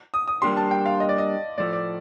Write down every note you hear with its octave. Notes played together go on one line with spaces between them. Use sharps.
D#6
D#6
G3 A#3 D4 G4 C6
A5
G5
F5
D#5
D5
D#5
A2 F3 A3 D5
D5